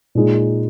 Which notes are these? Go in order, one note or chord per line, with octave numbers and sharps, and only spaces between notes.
A#2 G#3 D#4